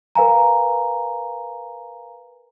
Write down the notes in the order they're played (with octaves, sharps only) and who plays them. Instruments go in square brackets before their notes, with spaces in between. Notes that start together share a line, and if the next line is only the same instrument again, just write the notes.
[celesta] A#4 B4 F5 G#5 A#5